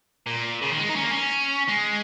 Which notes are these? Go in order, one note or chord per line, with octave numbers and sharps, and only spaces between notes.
A#2
C#3
D#3
G#3
D#4
C#4
A#3
C#4
G#3